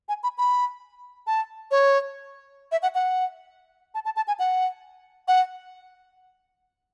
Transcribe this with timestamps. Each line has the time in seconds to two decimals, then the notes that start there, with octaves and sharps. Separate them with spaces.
0.09 G#5
0.23 B5
0.38 B5
1.27 A5
1.71 C#5
2.72 E5
2.83 F#5
2.95 F#5
3.95 A5
4.05 A5
4.16 A5
4.28 G#5
4.39 F#5
5.28 F#5